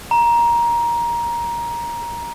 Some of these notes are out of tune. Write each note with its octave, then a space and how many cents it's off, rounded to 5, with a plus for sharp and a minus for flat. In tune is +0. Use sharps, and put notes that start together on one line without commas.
A#5 +15